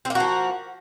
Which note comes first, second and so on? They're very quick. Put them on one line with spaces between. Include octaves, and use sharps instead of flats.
C4 A#3 F#4 F3